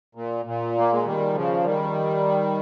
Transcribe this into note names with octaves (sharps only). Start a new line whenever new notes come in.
A#2
A#2
A#3
G#3
D#3 G3
C#3 F3
D#3 G3